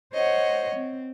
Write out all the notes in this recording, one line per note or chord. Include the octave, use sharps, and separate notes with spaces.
C5 C#5 D#5 F#5
C4